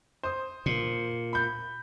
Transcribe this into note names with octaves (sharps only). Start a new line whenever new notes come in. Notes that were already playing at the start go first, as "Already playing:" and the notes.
C5 D#6
A#2
B5 G6